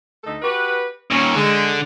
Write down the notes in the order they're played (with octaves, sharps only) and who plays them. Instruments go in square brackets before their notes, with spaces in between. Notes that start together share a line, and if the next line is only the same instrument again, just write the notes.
[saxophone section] D2 D#4 A4
F#4 G4 B4
[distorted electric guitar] D#2 A#2 [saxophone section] C#4
[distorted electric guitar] D3 [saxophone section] G#3